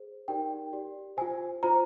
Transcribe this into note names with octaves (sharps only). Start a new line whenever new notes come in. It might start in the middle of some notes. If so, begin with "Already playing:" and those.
Already playing: G#4 C5
D#4 G4 A#4 D5 G5
G4 D5
F4 C5 G#5
F4 C5 A#5